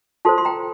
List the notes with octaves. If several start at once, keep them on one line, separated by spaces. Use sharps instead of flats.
F4 A4 C5 A5 C6
C6
G5 A#5